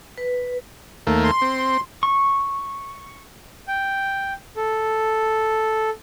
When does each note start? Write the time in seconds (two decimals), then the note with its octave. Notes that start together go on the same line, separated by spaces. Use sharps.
0.18 B4
1.07 D#2 A3 A#3
1.24 C6
1.42 C4
2.03 C#6
3.68 G5
4.56 A4